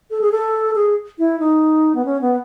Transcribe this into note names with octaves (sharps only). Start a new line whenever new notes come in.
A4
G#4
A4
G#4
E4
D#4
B3
C#4
B3